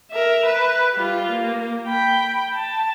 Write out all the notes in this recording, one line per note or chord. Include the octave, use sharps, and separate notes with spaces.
A#4 E5
B4
G3 F4
A#3
G5 B5
A5